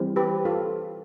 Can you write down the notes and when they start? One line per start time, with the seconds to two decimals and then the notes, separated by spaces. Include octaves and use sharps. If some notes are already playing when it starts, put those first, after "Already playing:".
Already playing: E3 G3 C4
0.16 G4 B4
0.45 F4 A4